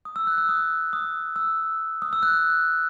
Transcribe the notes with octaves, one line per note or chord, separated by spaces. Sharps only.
D#6
E6
F#6
E6
D#6
D#6
E6
D#6
E6
F#6